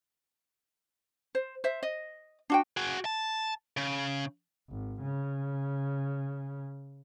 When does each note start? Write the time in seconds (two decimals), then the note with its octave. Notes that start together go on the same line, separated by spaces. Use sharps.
1.35 C5
1.64 C5 E5
1.83 D#5
2.50 D4 F#4 G5
2.77 F#4 G#4
3.05 A5
3.77 C#3
4.70 G#1
5.01 C#3